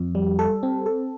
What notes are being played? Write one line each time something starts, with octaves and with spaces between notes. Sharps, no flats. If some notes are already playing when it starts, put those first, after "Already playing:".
Already playing: F2
G3
A4
C4
A4